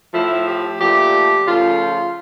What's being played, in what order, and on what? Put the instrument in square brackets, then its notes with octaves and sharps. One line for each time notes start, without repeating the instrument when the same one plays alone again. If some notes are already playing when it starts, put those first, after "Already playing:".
[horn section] A2 F3 A3 E4
G4
A#2 F3 A3 G4
C#3 F3 A3 F4